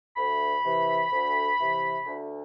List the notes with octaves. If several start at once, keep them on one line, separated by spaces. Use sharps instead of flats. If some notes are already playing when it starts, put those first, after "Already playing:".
D2 B5
C3 E3
D2
C3 E3
D2